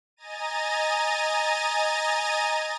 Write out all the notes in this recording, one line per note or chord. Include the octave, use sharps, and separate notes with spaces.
D#5 G#5 A#5 A6 D#7